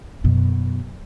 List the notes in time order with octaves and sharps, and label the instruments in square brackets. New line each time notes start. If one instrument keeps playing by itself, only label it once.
[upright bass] F#2 B2